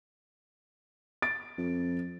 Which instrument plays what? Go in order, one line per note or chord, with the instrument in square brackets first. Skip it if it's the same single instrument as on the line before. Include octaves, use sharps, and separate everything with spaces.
[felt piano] A6 D7
[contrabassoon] F2